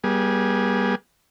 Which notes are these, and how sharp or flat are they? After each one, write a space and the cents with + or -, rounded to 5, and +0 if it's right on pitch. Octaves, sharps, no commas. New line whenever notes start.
G3 +0 B3 -40 G#4 +0